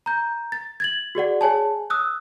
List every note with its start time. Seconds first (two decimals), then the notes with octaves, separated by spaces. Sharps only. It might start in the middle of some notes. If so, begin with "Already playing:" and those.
0.06 A#5 G6
0.52 A6
0.80 G#6 A6 F#7
1.15 F#4 G#4 D5 F#5
1.41 G#4 C#5 G#5 A5
1.90 D#6 E6 F#6